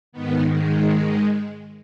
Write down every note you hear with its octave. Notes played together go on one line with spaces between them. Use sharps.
G#2 D#3 B3
G#3